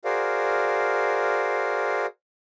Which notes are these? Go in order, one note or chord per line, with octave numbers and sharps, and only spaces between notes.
F#4 G#4 A#4 C5 D5 F5